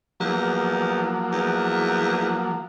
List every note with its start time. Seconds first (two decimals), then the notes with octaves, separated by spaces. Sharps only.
0.20 E2 F3 F#3 A#3
1.32 E2